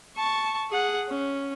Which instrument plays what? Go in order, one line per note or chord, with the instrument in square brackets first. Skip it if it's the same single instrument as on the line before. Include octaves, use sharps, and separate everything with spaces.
[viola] A5 C#6
G#4 F#5
C#4